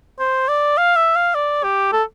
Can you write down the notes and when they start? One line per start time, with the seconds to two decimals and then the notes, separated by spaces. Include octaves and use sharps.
0.20 C5
0.48 D5
0.78 F5
0.96 E5
1.16 F5
1.35 D5
1.64 G4
1.92 A4